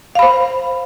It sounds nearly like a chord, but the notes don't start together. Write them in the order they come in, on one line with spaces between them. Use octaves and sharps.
F5 B5 C5